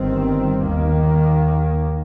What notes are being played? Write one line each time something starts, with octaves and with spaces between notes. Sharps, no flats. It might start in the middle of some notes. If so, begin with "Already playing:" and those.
Already playing: G1 G2 D#3 C4
D#2 D#3 A#3